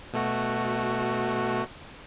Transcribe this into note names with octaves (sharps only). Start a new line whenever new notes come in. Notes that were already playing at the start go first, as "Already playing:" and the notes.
B2 A3 F#4